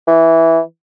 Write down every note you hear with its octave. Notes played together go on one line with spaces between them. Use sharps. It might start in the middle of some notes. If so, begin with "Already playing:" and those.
E3